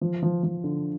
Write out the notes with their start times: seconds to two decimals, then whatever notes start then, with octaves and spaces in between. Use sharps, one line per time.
0.01 F3
0.23 F3
0.43 F3
0.64 D3